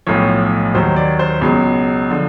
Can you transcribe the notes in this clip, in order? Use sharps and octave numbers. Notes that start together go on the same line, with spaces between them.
B1 A2 F3 C#5
D#2 D#3 F#3 C5
D5
C5
C#2 B2 F#3
D3 F3